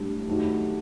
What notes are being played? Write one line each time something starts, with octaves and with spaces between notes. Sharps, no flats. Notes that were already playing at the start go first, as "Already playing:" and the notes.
Already playing: A2 G3 D4 G4
D#3 F#3 A3 D#4 G4